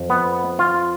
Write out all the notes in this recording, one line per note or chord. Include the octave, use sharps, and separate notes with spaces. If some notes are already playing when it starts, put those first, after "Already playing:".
Already playing: F2
B3
F4